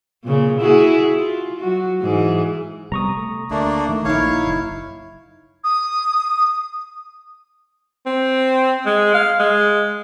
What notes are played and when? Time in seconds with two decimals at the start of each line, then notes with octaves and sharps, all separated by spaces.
0.24 A#2 C#3
0.59 E4 F#4 G#4
1.18 F4
1.60 F#3 F#4
2.02 G#2 E3 G#4
2.92 C3 G3 B3 A#5 C#6 D#6
3.17 A3
3.51 D2 A3 A#3 D4
3.89 D#3 A3
4.05 A#1 A#3 D#4 E4 C#5 F5
4.45 F#1
5.63 D#6
8.06 C4
8.86 G#3
9.14 F5
9.39 G#3